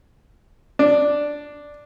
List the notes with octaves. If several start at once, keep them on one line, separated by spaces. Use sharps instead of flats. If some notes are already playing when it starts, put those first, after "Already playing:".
D4